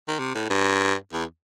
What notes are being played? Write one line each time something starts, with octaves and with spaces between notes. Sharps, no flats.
D#3
C3
A2
G2
E2